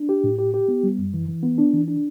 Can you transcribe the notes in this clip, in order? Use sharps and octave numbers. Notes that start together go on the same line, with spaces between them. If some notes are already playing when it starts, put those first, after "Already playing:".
Already playing: D4
G4
A2
G4
G4
B3
G3
F#2
E3
E3
B3
D4
E3
D4